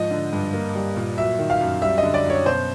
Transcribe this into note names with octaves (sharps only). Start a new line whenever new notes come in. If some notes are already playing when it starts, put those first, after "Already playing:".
Already playing: G#2 F3 D#5
D3
G2
A#3
G3
A#2
F#3 E5
D#3
F5
F#2
G3 E5
D#5
D3
D5
F#2 C#5
B2 C5